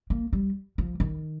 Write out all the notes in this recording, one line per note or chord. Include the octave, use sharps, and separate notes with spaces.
A#3
G3
F3
D#3